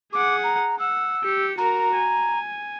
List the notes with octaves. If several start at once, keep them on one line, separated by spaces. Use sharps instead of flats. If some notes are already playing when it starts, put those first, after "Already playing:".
G#4 F#5 D6
A#5
F#5 E6
G4 C#7
F#4 A#4 A#5
G#5